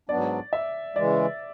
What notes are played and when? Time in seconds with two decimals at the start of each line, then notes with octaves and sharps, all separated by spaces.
0.09 G#2 F#3 B3 D4 D5
0.53 E5
0.96 C#3 E3 G#3 D5